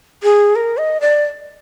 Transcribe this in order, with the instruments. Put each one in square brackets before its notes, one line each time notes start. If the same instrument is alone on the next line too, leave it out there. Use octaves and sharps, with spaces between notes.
[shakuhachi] G#4
A#4
D#5
D5